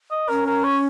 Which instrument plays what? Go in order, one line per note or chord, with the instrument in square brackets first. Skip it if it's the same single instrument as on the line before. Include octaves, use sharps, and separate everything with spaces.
[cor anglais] D#5
[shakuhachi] C#4 [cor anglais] A#4
[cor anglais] A#4
C#5